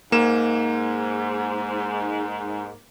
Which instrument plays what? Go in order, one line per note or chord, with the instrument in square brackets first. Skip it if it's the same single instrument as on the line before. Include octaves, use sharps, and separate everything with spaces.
[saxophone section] G#2 [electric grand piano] A#3 E7